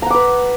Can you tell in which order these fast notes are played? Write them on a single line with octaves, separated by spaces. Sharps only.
A#5 F#5 D6 B4